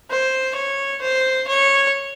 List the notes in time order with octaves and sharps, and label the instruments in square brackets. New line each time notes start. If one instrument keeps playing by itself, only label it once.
[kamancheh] C5
C#5
C5
C#5